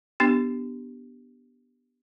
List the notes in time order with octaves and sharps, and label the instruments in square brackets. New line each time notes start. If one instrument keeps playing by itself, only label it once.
[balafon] B3 D4 G4